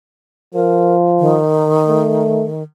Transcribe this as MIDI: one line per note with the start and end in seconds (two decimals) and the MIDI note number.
0.54 1.39 53
0.54 0.95 70
1.20 2.63 51
1.88 2.46 57